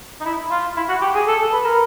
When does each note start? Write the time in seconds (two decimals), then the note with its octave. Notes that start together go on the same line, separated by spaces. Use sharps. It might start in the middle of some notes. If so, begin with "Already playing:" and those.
0.21 D#4
0.25 E4
0.51 F4
0.77 E4
0.89 F#4
1.02 G4
1.15 G#4
1.27 A4
1.52 B4
1.65 A#4